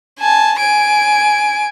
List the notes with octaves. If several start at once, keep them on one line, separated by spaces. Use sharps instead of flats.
G#5 A5
G#5 D7